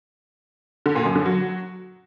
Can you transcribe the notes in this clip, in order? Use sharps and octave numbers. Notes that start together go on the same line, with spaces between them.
D3
A#2
F#2
D3
F#3